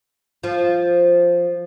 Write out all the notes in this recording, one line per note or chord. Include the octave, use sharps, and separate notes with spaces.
F3